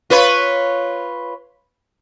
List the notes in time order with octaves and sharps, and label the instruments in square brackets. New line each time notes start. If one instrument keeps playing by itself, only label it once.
[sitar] F4 B4 C#5